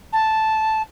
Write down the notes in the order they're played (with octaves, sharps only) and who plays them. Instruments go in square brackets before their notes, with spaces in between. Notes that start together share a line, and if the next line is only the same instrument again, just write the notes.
[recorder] A5